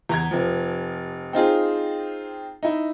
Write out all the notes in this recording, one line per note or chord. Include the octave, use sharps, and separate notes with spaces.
E2 A#5 G#6
F1 F3
C4 D#4 F4 G#4
D#4 E4